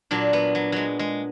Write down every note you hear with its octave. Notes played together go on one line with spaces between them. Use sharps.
A#2 F#3 D4
B3
F#3
F#3 G#3
G#3